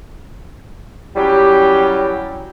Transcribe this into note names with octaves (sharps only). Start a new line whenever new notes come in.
F#3 G3 C#4 E4 G4